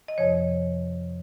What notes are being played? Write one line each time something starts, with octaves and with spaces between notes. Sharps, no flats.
D#5
F2 C3 F3 C#5